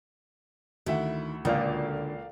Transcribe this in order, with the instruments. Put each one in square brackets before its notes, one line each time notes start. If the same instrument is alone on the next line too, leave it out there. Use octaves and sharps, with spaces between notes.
[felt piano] D2 E5 F#5 [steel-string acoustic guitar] D#3 E4
[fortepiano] C#2 A#2 [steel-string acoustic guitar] D3 [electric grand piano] A#4 D5 F5